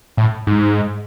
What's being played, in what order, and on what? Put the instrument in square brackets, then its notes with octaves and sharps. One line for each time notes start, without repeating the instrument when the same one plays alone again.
[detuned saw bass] A2
G#2